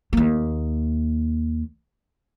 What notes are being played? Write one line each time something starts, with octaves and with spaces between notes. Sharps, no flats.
D#2 A#3